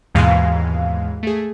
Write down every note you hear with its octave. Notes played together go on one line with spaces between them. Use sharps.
D#2 G#2 B2 E3 G#3 F5
A3 G#4